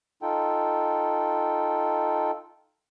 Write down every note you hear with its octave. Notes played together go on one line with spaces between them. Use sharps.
D#4 F4 A4 G5